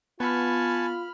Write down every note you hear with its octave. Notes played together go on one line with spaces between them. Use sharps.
B3 F4 G#5 A5 B5 C#6 F6